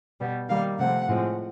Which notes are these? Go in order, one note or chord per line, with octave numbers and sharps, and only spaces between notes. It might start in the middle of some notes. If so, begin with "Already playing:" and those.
B2 G3 B3
D#3 G3 A#3 F5
C3 F3 A3 C4 F#5
A2 F3 G#3 C4